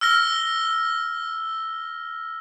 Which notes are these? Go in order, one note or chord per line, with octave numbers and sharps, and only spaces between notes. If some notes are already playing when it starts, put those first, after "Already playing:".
E6 F6 A#6 G7